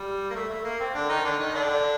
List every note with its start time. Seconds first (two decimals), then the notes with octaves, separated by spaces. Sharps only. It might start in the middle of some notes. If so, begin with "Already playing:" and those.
Already playing: G3
0.30 A#3
0.35 A3
0.50 A3
0.64 A#3
0.80 C4
0.94 D3 D4
1.09 D#3 D#4
1.25 D3 D4
1.39 D#3 D#4
1.54 D3 D4